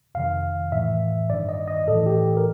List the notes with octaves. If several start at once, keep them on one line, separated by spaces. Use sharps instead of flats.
F2 C3 D#3 F5
A2 E3 E5
G2 D#3 D5
D#5
D#5
A2 E3 A4
G4
A#4